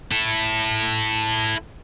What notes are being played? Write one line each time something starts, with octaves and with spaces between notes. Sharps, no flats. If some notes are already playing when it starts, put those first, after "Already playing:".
E4 A4